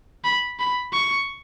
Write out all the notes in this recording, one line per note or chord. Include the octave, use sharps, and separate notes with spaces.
B5
B5
C#6